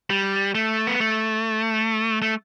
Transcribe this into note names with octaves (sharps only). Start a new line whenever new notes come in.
G3
A3
B3
A3
A3